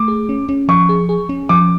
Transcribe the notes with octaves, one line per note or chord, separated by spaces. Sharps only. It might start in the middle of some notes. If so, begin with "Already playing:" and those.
Already playing: A3 D6
G#4
C#4
C#4
F3 C#6
G#4
G#4
C#4
F3 D6